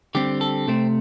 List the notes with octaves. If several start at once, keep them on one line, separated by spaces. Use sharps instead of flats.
D3 G3 C4 G4
A4
C3 A3 C4